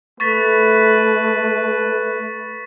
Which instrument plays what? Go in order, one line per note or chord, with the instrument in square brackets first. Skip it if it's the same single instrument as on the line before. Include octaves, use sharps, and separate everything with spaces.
[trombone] A3 [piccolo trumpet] B4 [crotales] C#6 A6 B6